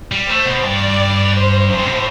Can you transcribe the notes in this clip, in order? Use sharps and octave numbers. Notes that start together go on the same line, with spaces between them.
G3
A3 C5
B2
G2 D5
C5
F#2 C5
G2
B2
A2